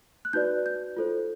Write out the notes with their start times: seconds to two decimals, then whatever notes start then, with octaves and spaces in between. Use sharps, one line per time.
0.25 F#6
0.33 D#4 F#4 B4 D5 G6
0.66 G6
0.97 F4 A4 C5